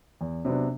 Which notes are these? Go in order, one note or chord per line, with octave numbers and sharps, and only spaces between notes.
E2
C3 F#3 B3 D4